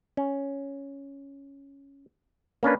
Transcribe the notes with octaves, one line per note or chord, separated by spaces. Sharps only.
C#4
A#3 C#4 D4 B4